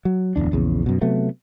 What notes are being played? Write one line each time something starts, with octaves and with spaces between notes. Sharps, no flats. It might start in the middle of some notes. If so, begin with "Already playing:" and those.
F#3
D1 G1 E2 D4
A#1 E2 C#3
F#2 B2
C3 F#3 A3 B3